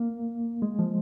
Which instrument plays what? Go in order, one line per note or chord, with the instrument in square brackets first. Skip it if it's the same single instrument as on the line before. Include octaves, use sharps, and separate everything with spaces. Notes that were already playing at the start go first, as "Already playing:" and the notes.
Already playing: [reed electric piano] A#3
G#3
F3